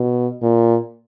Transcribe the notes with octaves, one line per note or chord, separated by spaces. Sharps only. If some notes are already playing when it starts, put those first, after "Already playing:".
Already playing: B2
A#2